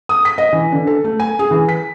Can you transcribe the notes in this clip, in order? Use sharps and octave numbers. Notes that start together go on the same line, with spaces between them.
D#6
B6
D#5
E3
D3
A4
A3
G#5
G#4
E3
B6